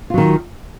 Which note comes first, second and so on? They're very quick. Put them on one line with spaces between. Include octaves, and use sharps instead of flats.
F4 F#3 D#3